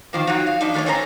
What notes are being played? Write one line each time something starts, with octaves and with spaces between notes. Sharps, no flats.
D#3 F3 A#3
F3 F#3 C4 D#4 F#4
F5
F3 D4 D#4
D#3 A3 G#4 A4 C#5
D#3 A3 C#4 C5 D#5 A#5